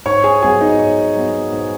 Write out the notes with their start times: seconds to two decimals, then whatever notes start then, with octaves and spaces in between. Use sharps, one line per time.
0.06 G#2 C#5 C#6
0.24 G#4 G#5
0.42 F#3 B3 G#4 G#5
0.61 D#4 D#5
0.79 G#2 C#5
1.16 F#3 B3
1.52 G#2